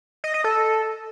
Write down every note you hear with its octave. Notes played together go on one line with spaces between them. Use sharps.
D#5
D#5
A4